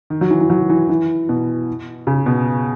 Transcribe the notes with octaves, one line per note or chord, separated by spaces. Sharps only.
D#3
F#3
E3
E3
F#3
E3
E3
B2
C#3
B2